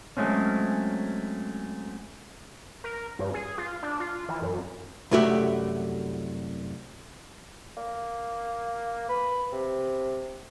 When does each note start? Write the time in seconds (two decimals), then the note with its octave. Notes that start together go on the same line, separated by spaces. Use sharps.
0.17 F#3 G#3 A3 C4 C#4
2.84 A#4
3.19 G2
3.34 G#4
3.58 F4
3.83 D4
4.00 F4
4.29 E3
4.42 F#2
5.11 C2 F#2 A3 F#4 G4 E5
7.77 A#3
9.09 B4
9.52 C3